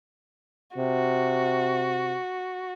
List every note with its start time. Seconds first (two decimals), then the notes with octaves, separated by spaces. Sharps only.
0.77 C3 F#4